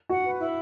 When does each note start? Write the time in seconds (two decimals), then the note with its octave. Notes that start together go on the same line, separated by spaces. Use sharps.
0.09 F#4 F#5
0.24 B4
0.39 E4